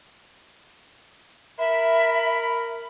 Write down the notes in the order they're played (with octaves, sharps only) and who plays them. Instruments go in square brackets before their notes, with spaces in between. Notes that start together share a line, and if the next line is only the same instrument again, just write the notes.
[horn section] A#4 B5 [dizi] E5